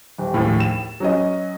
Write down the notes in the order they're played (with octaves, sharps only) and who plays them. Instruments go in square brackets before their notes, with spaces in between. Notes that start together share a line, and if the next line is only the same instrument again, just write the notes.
[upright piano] D#1
A#1 D#2 A2
E7
F#3 C#4 D#5